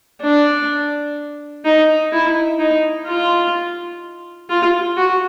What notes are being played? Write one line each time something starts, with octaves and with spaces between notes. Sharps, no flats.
D4
D#4
E4
D#4
F4
F4
F#4